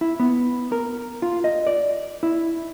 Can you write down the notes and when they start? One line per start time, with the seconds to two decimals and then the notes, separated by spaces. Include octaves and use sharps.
0.01 E4
0.20 B3
0.72 A#4
1.22 F4
1.44 D#5
1.67 D5
2.23 E4